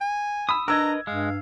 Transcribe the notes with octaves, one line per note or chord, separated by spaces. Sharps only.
G#5
B5 D#6 E6
D4 A#4 B4 D#5 A#5 E6 G#6
G2 G#3 F5